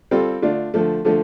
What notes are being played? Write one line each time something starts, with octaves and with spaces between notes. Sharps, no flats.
G3 C4 F4 A4
D3 A3 D4 F4
D3 F3 A3
D3 F3 A3